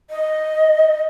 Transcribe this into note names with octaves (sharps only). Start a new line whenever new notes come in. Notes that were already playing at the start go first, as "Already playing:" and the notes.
D#5